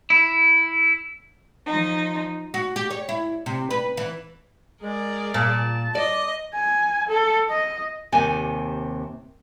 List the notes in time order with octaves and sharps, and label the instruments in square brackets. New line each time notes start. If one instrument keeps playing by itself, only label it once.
[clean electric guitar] E4
[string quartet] F3 D#4
[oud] F#4
G4
C#5
E4
C3
B4
E3
[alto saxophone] G#3 [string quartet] G#4 A#4 D5
[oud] A#2 [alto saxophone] A5
[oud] D5 [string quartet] D#5
[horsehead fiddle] G#5
A4
D#5
[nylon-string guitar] D#2 C3 G#5